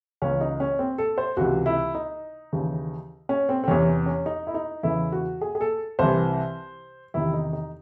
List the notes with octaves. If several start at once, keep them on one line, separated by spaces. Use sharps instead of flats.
C#2 C#3 E3 C#4
D#4
C#4
C4
A4
C5
C#2 C3 E3 F#4
E4
D#4
D#2 C#3 E3
C#4
C4
C4
E2 C3 E3 C#4
C#4
D#4
E4
D#4
E2 C#3 E3 E4
F#4
G#4
G#4
A4
C2 C3 E3 C5
E2 C3 D#3 E4
D#4
D#4